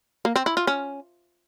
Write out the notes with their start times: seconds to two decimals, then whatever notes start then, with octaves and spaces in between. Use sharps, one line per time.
0.25 A#3
0.36 C4
0.46 E4
0.57 F4
0.67 C#4